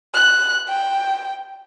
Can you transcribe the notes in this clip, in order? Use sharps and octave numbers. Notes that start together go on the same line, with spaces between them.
F#6
G5